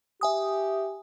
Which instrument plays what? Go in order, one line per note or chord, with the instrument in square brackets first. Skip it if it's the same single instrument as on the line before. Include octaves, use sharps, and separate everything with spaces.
[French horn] G4 [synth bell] E5 G#5 D#6